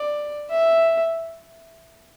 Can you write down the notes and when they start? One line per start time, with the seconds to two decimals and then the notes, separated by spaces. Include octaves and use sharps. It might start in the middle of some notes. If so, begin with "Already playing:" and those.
Already playing: D5
0.50 E5